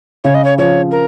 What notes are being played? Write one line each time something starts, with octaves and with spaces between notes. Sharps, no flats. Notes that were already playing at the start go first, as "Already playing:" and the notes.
C#3 C#5
D#5
C#5
F3 C#5
A#4